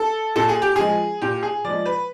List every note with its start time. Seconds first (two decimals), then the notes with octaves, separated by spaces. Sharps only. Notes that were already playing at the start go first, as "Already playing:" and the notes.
Already playing: A4
0.36 A#2 A4
0.49 G#4
0.62 G4
0.76 F3 G#3 G#4
1.21 A#2 G4
1.43 G#4
1.64 F3 G#3 D5
1.86 B4